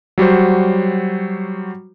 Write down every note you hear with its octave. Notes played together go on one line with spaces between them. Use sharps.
F#3 G3 F#4 C5